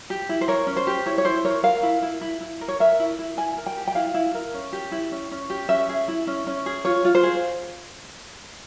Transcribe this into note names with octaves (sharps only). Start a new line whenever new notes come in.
G4
E4
C5
A#4 C#5
C#4
C5
G4
E4 C#5
C#5
E4 C5
A#4 C#5
A#4 F5
E4
E4
E4
E4
A#4
C#5
A#4 E5
E4
E4
E4 G#5
A#4
G5
G4
G5
E4 F5
E4
A#4
C#4
G4
E4
C#4
C#4
G4
C#4 E5
G#4
E4
C#4
C#4
G#4
F4 C#5
F4
C5
G#4